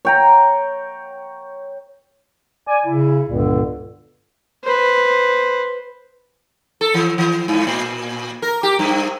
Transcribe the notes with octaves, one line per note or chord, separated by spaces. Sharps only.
C#5 G5 A#5
D5 G#5
C#3 E4
C#2 G2 A#2 D3 B3
B4 C5
A4
E3
E3
G#2
A#2
A#4
G4
G2